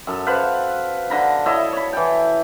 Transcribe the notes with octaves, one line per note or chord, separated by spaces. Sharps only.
F#2 A4
B4 C5 F5 F#5
D3 A#5 B5
E4 A4 C#5 D#5
C#5 B5
E3 G5